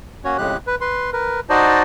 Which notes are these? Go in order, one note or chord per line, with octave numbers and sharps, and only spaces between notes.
A#3 C#4 F#4 C#5
F2 A2 C#3 G#3 G4 F#6
B4
B4 C6
A#4 B4
D#4 F#4 C5 D5 D#5 A5